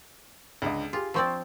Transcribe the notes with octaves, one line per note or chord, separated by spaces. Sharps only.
C#2 D3 D#5
F4 G4 G#4
F3 C4 D5 C6 C#6 E6